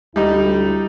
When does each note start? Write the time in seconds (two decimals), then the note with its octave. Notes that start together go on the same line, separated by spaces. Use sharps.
0.16 D2 G3 D#4 E4